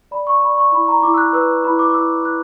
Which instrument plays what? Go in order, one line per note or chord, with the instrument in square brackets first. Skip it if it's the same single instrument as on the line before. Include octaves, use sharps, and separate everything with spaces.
[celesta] D5 B5
C#6
D5 B5
C#6
E4 B5
A#5
E4 D6
E6
F#6
B4 E6
E4 B5
D6
D6
E4 E6
E4 F#6